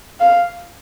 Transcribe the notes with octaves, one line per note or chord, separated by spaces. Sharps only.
F5